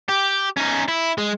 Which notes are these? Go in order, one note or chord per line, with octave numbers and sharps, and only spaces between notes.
G4
C#4 D#4
E4
G#3